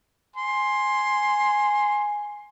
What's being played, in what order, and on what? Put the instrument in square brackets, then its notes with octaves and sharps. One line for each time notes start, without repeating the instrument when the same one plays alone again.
[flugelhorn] G#5 [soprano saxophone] C6